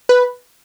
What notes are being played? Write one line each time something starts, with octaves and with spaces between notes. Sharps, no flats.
B4